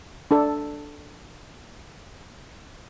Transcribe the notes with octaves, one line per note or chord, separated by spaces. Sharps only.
D4 A4